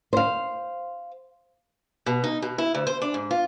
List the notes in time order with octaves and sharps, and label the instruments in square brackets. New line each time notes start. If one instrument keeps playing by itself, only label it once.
[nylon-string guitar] C5 F5
[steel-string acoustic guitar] B2
D#4
B2
E4
D2
C5
D4
G#2
F4